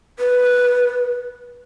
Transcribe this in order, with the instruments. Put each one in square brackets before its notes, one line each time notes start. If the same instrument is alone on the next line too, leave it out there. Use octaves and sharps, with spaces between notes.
[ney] B4